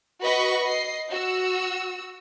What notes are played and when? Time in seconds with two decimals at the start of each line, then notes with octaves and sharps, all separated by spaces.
0.21 F#4 B4 D#5 B5 C#6
0.65 D#5 C7
1.10 F#4 E6